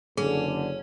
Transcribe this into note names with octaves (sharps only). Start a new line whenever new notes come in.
F#1 D3 C#4 G#4